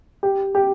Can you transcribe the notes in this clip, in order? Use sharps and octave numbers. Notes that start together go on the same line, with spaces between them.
G4
G4